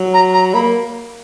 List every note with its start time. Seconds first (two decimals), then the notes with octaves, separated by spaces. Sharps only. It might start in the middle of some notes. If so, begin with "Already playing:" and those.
Already playing: F#3
0.14 A#5
0.34 A#5
0.54 A#3 B5